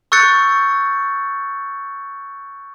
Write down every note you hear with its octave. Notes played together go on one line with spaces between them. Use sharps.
C#6 E6 F#6 G6 A6 C#7